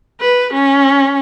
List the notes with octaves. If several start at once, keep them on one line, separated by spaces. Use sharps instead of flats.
B4
C#4